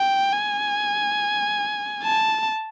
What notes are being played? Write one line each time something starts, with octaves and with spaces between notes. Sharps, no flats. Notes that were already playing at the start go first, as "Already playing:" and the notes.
Already playing: G5
G#5
A5